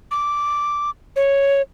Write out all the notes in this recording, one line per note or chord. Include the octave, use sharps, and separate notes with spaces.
D6
C#5